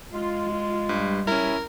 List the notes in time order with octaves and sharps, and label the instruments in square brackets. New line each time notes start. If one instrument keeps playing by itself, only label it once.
[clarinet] G#3 [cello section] F4
[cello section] F4
[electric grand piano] G2 [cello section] G3
[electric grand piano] C#4 E4 [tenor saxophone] A#4